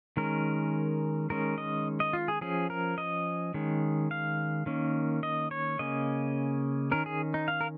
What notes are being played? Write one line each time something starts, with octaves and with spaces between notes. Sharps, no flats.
D#3 G#3 C#4 A#4
D#3 G#3 C#4 A#4
D#5
D#5
F4
G#4
F3 C#4 G#4
A#4
D#5
D#3 G#3 C#4
F5
D#3 A#3 C#4
D#5
C#5
C#3 A#3 C#4 D#5
D#3 C#4 A#4
G#4
D#4
F5
A#4